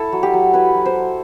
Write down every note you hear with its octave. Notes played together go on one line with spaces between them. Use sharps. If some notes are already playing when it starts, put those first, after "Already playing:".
Already playing: E4 A4
F#3
G4
F#3
E4 B4
F#3
C5
E4